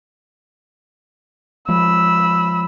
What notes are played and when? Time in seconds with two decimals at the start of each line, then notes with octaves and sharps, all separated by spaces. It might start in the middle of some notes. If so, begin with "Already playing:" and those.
1.69 F3 G#3 B5 E6